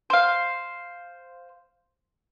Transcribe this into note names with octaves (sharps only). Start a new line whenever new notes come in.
C5 F5